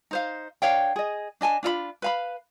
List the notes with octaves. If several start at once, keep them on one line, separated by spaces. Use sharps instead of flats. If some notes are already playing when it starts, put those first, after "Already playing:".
D#4 C5 F5
D4 C#5 F5 G5
G#4 D#5
D4 D#5 G#5 A5
D4 F4 D#5 B5
B4 F5 B5